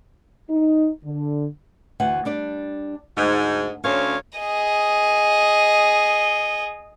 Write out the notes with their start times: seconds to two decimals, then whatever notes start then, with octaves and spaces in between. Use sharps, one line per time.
0.50 D#4
1.04 D3
2.00 D2 E3 F#5
2.25 G3 D4 D5
3.17 D2 G#2
3.84 D2 C#4 C5 C#5 F5
4.39 G#4 D#5